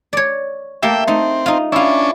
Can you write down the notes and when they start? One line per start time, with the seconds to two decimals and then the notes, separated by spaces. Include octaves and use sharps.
0.13 C#5 D5
0.83 A3 A#3 G4 E5 G5
1.07 A3 C4 D#4
1.46 D#4 F4
1.72 C#4 D4 E4 F4